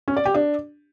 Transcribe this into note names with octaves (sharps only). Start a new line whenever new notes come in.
C#4
D5
G4
D4